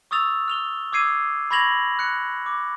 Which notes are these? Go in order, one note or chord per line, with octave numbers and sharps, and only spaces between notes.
C#6 D#6 E6 A6 F7
F6 F7 G7
D6 E6 G#6 C7 D#7
B5 C#6 G#6 A#6 F7 F#7
F#6 C#7
D6